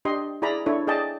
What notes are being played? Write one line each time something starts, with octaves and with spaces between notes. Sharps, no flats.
D4 G4 D#5 C6
E4 G#4 D5 A#5 B5
D4 E4 A4 C#5
G#4 D5 D#5 G5 A5